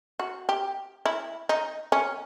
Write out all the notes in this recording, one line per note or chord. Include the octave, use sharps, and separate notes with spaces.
F#4
G4
E4
D#4
C#4